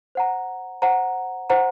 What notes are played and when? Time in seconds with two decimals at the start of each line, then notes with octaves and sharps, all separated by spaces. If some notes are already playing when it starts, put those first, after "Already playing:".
0.15 C5 F#5 A#5
0.82 C5 F#5 A#5
1.50 C5 F#5 A#5